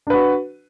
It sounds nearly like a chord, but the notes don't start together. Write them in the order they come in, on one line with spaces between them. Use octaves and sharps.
D4 B4 F#4